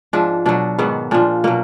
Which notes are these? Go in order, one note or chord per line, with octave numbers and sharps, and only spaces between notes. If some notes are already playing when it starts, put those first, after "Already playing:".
G#2 F3 D4
B2 F#3 D4
G#2 D#3 F#3 B3
A#2 F3 D4
B2 F#3 A#3